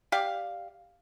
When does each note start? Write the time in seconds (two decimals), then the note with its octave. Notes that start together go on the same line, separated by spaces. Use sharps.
0.12 G4 D5 F5